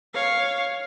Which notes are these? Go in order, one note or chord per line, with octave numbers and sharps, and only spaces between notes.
C#5 F5